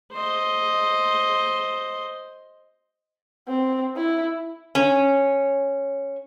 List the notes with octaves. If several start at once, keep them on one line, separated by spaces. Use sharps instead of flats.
C5 D#5
C4
E4
C#4